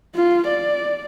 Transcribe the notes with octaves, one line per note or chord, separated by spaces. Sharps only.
F4
D5